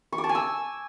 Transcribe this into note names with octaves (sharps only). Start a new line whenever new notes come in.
C#6
D6
A5
G#5
E6